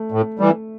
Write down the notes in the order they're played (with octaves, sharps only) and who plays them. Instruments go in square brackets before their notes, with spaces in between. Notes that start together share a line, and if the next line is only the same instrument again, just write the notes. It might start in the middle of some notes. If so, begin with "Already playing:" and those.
Already playing: [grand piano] A3
[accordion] A2
E3 G3